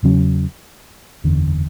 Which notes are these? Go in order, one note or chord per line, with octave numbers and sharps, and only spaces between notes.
E2 C#3 F#3 C#4
F#1 E2 D3